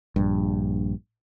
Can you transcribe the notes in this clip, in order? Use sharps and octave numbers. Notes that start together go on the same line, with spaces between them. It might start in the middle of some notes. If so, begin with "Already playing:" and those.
A#1 G2